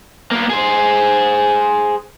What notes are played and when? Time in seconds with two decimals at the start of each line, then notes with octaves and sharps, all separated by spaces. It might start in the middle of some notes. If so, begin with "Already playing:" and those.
0.31 A#3 B3
0.50 G#4 C5